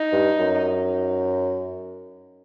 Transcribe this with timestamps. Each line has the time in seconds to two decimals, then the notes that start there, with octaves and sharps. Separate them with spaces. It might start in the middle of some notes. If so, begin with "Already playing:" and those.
Already playing: D#4
0.13 G2
0.39 F#2